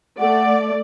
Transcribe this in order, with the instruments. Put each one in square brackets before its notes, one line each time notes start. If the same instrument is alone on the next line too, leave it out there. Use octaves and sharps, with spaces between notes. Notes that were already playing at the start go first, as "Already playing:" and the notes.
[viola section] A3 D5 [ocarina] F#5